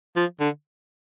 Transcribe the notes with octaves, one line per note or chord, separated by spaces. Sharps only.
F3
D3